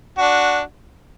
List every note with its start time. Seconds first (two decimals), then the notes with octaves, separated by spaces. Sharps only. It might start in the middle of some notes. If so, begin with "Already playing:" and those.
0.18 D4 F#4